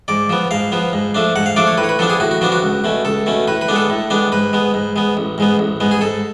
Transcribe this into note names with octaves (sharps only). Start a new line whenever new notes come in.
G#2 D5
F3 B3
G#2 F5
F3 B3
G#2
F3 A3 D4
G#2 F#5
F5
F3 A3 D4 D5
C#5
A2 B4
C#5
B4
F3 B3 D4 A4
G#4
A2 F#4
F#4
F3 B3 D4 F#4
F#4
C#2
B2 A3 C#4
C#2 A4
B2 A3 C#4
A2 B4
B4
G#3 B3 D4
A4
A2
G#3 B3 D4
G#2 B4
G#3 B3
G#2
G#3 B3
A1
G#2 G#3 B3
A1
G#2 G#3 B3
G#4
G#2 A4